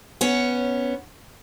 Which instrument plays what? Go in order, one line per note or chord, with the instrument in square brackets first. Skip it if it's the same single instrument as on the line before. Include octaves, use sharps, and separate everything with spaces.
[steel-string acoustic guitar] B3 C#4 C#5